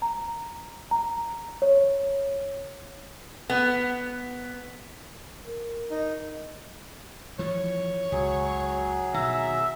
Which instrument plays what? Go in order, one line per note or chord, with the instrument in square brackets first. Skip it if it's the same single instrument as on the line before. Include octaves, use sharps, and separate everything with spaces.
[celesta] A#5
A#5
C#5
[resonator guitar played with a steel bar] B3
[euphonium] A#4
[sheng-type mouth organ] D#4
[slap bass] E3 F3 [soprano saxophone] C#5
[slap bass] C#2 [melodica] F#3 G#4
[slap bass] B2 D#3 [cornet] E5 [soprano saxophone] A#5